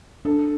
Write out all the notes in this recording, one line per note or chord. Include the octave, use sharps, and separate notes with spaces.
D4 A4